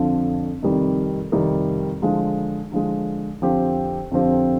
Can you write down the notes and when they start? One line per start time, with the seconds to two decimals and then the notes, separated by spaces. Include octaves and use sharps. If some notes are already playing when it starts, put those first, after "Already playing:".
Already playing: F2 D3 F3
0.63 F2 C3 D#3 G3
1.32 F2 C3 D#3 G3
2.02 D3 F3 G#3
2.72 D3 F3 G#3
3.42 F2 D3 F3 C4 G4
4.11 F2 D3 F3 C4 G4